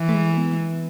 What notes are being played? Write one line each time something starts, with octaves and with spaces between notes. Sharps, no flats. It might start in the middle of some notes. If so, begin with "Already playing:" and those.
Already playing: E3
A3
G#3
B3